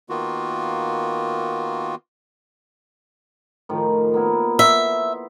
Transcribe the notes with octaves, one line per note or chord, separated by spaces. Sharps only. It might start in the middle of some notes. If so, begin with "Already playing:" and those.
D#3 A#3 B3 F4 F#4
A2 D#3 F3
A#3 B3 E4
B3 E5 C6